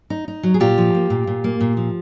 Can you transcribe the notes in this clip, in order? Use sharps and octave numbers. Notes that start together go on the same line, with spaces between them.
D#4
D#4
F#3
G#4
A#2 F4 G4
F3
A#3
A#2
A#2
A#3
A#2
F3